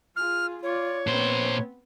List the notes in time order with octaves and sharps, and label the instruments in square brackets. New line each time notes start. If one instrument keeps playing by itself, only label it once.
[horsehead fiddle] F4 G#4 [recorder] F6
[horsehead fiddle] F4 D5 [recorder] C#5
[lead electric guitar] A#2 C5 [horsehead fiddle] B3 C4